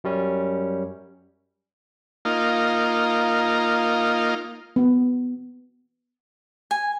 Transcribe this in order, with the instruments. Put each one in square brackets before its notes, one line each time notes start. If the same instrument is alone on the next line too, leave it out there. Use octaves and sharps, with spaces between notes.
[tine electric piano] F#2 G3 C#4
[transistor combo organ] A#3 D#4 F4
[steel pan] B3
[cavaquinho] G#5